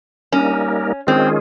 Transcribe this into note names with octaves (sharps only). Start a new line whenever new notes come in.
G3 A#3 C#4 D#4 A#4
D#3 G#3 C4 C#4 F4 G#4